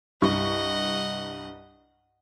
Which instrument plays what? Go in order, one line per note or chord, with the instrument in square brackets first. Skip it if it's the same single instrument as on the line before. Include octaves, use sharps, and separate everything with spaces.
[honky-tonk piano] C2 G2 C#6 [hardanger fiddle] D#5 F#5